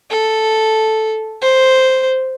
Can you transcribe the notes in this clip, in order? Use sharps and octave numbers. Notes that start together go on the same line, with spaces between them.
A4
C5